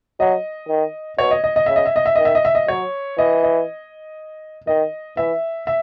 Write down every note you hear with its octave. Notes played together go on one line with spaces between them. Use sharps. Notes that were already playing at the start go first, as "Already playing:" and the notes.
F#3 D#5
D#3
B2 C#5
D#5
D#5
D#5
C#3 E5
D#5
E5
D#5
E5
D#3 D#5
E5
D#5
E5
D#5
F#3 C#5
E3 D#5
D#5
D#3 D#5
E3 E5
E5